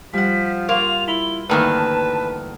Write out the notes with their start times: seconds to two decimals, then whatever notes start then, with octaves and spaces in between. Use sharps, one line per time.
0.13 F3 G3 F#5 B6
0.69 A#3 F4 F7
1.08 E4 B5 G7
1.49 D2 G2 D#3 E3 A#3 B4 A5